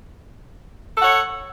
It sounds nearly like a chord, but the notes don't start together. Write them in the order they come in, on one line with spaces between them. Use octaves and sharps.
A4 F#5 C#5